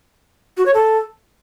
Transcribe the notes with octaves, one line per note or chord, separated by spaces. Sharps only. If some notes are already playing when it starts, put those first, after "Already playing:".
F#4
C#5
A4